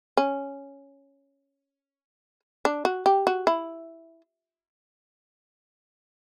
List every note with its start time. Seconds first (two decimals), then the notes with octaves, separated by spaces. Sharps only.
0.17 C#4
2.65 D4
2.85 F#4
3.06 G4
3.27 F#4
3.47 E4